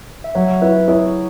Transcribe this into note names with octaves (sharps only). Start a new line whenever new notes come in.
E5
F#3 C#5 F#5
E4 B4 E5
E4 G#4 C#5